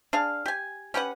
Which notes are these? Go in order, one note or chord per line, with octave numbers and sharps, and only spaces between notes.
D4 G#4 F5
G4 G#5
C#4 G4 B4 F#5